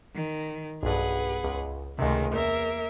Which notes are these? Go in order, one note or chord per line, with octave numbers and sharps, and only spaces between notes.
D#3
B1 G2 G#4 B4 F#5
C#2
C#2 C3 D#3 G#3 A3
E2 A#3 A#4 E5